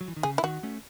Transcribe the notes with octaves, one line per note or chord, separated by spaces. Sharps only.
F#3
E3
D#3
C#3 G#4
E4
D#3 F#4
A3 C#4